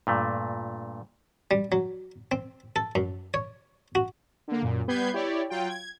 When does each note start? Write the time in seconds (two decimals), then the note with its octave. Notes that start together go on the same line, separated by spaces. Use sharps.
0.07 G2 A#2 A3
1.51 G3
1.72 F#3
2.32 C4
2.76 A4
2.95 F#2
3.34 C#5
3.95 F#4
4.48 D3 A#3
4.62 F#2 A#2
4.87 G3 B3 B4 G6 G#6 C7
5.13 E4 G4 C#5 D5
5.50 F#3 F4 G5
5.69 G#6